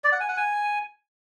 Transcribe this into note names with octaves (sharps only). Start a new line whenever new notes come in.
D5
F#5
G#5
F#5
G#5